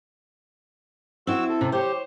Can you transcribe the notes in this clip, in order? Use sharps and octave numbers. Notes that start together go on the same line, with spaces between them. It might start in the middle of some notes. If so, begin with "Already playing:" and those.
C4 E4 F#4 E6
A4
C3
G4 C5 C#5